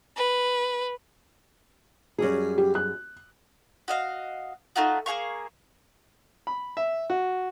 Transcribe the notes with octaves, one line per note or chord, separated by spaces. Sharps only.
B4
F#2 G3 G#4
G4
F#6
F#4 D#5 F5
A3 D#4 F4 F#4
A#3 G#4 F5 C#6
B5
E5
F#4